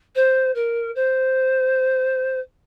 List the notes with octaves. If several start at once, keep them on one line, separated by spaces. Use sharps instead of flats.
C5
A#4
C5